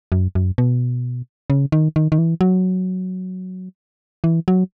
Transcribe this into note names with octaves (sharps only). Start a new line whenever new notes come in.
F#2
F#2
B2
C#3
D#3
D#3
D#3
E3
F#3
E3
F#3